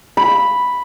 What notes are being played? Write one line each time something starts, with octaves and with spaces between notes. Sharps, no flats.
B5